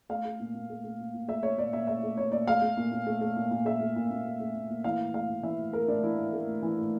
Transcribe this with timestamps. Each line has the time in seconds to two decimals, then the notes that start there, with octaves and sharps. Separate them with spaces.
0.09 A3 F5
0.25 A3
0.40 A#2
0.55 A#2
0.70 A3
0.84 A3
0.99 A#2
1.14 A#2
1.28 A3 E5
1.43 A3 C#5
1.58 A#2 D5
1.73 A#2 E5
1.87 A3 E5
2.03 A3
2.17 A#2 C#5
2.32 A#2 D5
2.47 A3 F5
2.62 A3
2.77 A#2
2.92 A#2
3.06 A3
3.21 A3
3.36 A#2
3.51 A#2
3.65 A3 E5
3.81 A3
3.96 A#2
4.11 A#2
4.25 A3
4.40 A3
4.54 A#2
4.70 A#2
4.84 E3 F5
4.99 A2
5.14 A3 F5
5.28 A2
5.43 E3 E5
5.59 A2
5.73 A3 A#4
5.88 A2 D4
6.03 E3 E4
6.18 A2
6.33 A3
6.47 A2
6.62 E3
6.77 A2